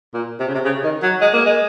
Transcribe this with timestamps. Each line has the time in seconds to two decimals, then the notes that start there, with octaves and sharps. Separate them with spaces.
0.14 A#2
0.39 C3
0.47 C#3
0.54 C3
0.65 C#3
0.83 D#3
1.03 F#3
1.21 G#3
1.33 A#3
1.45 G#3